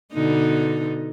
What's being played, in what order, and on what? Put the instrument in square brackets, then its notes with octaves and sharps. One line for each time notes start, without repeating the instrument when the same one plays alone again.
[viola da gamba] B2 D3 D#4